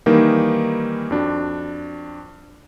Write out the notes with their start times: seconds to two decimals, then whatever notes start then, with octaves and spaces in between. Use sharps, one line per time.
0.06 D#3 E3 G3 A#3 D#4
1.11 F2 D4 F#4